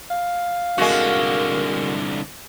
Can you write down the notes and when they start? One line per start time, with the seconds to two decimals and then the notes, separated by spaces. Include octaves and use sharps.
0.11 F5
0.78 C2 D3 G#3 F#4 A#4